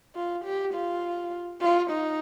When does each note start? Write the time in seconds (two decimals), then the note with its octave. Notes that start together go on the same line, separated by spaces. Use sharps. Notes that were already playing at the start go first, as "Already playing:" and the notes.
0.15 F4
0.44 G4
0.74 F4
1.61 F4
1.90 D#4